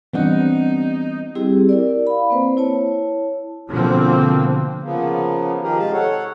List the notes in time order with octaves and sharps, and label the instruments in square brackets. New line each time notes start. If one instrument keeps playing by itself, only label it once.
[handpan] E3 G3 F#5 [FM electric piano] B3 C4 D4 [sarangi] D#4
[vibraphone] G3 C4 E4 G4 G#4
E4 A#4 D5
F5 B5
A#3 C4 B4 C5
E4 C#5 A5
[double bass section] B2 D3 F3 A#3 C4
[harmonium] C#3 F3 A#3 B3
D#3 F3 G4 G#4 A#4
C3 G#3 F5 A5
A4 C#5 F#5